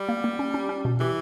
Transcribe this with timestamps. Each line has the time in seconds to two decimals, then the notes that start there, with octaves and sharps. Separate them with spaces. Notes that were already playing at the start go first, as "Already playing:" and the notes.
Already playing: G3
0.09 A#3
0.24 A#3
0.39 C#4
0.54 C#4
0.69 C#4
0.85 B2
1.00 E3 G4